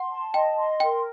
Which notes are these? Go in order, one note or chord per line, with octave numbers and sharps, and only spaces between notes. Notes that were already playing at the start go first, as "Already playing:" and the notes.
Already playing: F#5 C6
A5
D#5 G5
C6
A#4 G5